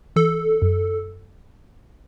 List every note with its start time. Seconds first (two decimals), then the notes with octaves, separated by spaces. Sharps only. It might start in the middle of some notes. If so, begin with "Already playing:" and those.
0.16 E3 A4
0.62 F#2